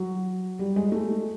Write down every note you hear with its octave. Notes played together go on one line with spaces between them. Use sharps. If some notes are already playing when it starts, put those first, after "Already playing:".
Already playing: F#3
G3
G#3
A3